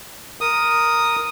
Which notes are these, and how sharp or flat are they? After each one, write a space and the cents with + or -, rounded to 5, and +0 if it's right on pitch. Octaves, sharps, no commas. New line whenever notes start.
A#4 +0 D#6 +0